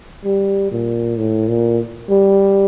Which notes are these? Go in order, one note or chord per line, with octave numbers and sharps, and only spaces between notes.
G3
A#2
A2
A#2
G3